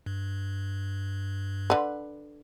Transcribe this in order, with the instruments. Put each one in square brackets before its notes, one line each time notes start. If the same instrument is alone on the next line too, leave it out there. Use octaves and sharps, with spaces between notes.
[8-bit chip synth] G2
[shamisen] D3 B4